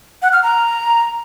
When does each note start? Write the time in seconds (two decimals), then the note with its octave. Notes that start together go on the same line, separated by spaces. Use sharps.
0.22 F#5
0.33 F6
0.43 A#5